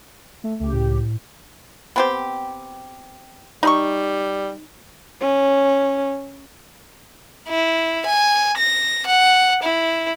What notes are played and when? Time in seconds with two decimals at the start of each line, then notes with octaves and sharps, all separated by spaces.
0.44 A3
0.60 C#2 A3 G4
0.73 A2
1.96 B3 C4 G4
3.63 G3 D#4 B5 C#6
5.21 C#4
7.49 E4
8.06 G#5
8.58 A#6
9.06 F#5
9.63 E4